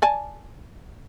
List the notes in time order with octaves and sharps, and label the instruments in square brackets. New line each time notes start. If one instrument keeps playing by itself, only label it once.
[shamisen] D5 G#5 A5